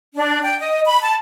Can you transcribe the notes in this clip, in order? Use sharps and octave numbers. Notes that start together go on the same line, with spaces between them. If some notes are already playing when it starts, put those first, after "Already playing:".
D4
G5
D#5
B5
A5